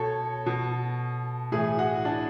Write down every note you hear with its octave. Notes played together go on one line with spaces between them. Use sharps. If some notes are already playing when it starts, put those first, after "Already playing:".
Already playing: B2 A4 C#5
B2
A2 E3 G#4
F#4
D4